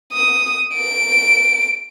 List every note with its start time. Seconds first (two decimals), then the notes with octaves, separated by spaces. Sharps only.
0.13 D#6
0.75 D7